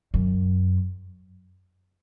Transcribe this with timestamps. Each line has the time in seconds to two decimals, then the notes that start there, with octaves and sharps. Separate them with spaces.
0.14 F#2